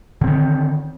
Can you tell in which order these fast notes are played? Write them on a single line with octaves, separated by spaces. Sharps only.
D3 C4 D#3